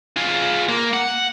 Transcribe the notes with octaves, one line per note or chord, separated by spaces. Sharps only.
F4 G#4
A#3
F#5